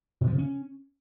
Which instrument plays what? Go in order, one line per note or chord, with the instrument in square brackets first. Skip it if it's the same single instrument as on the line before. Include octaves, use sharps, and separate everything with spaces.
[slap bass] B2
F3
C#3
C#4